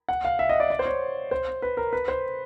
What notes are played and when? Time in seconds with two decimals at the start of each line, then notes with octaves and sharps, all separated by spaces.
0.09 F#5
0.25 F5
0.39 E5
0.49 D#5
0.60 D5
0.70 D5
0.79 C5
0.86 C#5
1.31 C5
1.62 B4
1.77 A#4
1.93 B4
2.08 C5